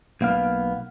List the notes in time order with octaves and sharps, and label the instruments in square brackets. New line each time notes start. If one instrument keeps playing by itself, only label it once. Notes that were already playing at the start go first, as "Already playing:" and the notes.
[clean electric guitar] B1 A#3 B3 F5